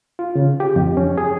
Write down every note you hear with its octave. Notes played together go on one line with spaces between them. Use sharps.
F4
C#3
G4
F2
C#4
G#4